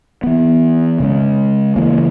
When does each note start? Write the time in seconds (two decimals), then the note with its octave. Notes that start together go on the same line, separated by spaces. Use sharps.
0.23 E3 B3
1.00 C#3 G#3 C#4
1.76 C#3 E3 A#3